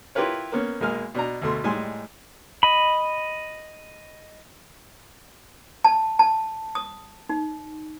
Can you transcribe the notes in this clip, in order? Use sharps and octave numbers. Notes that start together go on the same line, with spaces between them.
E4 F4 G4 A#4 B4 C#5
A#3 B3 C#4
B1 G#3 A#3 G#5 F6
B2 D4 A#5
D2 B2 A3 C6
A2 G3 G#3 D#4 G#5 C6
D#5 B5
A5
A5
D#6
D#4